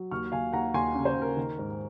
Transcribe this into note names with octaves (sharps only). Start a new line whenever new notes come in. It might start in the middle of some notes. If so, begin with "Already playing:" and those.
Already playing: F#3
D#2 C#6 F6
D#2 F5 G#5
D#2 F#5 A#5
D#2 G#5 C6
C#3
C5
D#2
A#4
D#3
G#2